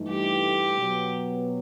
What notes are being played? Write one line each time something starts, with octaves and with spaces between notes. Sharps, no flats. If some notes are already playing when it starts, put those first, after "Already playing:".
Already playing: G2 E3 A3 D#4
G4
B2 F#3 B3